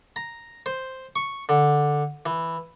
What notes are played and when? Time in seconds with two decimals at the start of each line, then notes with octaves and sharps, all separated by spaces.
0.16 A#5
0.66 C5
1.16 C#6
1.49 D3
2.26 E3